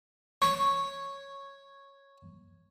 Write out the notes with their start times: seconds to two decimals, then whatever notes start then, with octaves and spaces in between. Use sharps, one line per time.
0.42 C#5 C#6